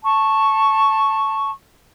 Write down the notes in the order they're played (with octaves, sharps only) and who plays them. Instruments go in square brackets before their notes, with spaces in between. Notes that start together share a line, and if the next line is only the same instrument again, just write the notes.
[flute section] A5 C#6